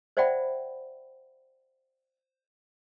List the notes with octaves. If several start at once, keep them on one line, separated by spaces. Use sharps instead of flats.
C5 D5 E5 F#5 G5 B5